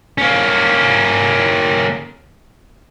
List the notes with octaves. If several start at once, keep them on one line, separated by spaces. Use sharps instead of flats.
A#3 C#4